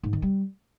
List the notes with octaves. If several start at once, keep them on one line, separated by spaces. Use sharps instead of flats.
G#2
D#3
G3